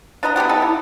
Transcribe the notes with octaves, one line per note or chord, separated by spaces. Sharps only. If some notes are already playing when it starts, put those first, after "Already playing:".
D4 B4 D#5 A#5
B3 D4 G4 F#5
B3 D#4 A4
E4